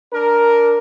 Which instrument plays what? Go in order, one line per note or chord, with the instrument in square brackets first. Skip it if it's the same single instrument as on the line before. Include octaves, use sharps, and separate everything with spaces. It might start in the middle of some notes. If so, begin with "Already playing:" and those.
[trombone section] D4 A#4